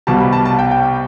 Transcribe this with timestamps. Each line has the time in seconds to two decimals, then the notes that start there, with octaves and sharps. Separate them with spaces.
0.07 C2 B2 G3 A5
0.20 B5
0.33 A5
0.45 A5
0.59 G5
0.71 G5